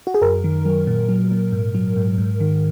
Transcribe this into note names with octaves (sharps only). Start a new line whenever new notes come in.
F#4
G#4
F#2 A#4
D#3
F#3
A#2
F#3
A#2
G#2
F#3
G#2
G#2
D#3